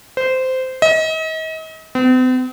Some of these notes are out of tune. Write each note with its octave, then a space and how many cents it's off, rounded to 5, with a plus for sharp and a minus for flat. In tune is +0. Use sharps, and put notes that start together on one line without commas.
C5 -15
D#5 +40
C4 -45